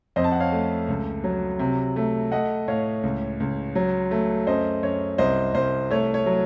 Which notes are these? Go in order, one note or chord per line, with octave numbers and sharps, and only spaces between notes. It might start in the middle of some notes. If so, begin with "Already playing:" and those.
F2 C5 D#5
A5
F#5
C#5 F5
A3
C#2
F#3
C3
A3
A3 D#5 F#5
A2 C#5 F5
C#2
C#2
F#3
A3
F#2 C5 D#5
F#2 C#5
C2 C5 D#5
C2 C5
A3 C#5
C#5
F#3